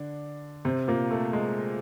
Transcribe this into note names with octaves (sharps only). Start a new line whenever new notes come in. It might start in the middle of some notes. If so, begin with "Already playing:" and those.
Already playing: D3 D4
C3 C4
A#2 A#3
A3
G#3